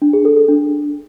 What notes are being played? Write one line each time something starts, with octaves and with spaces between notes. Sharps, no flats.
D4
G#4
A4
A4
D4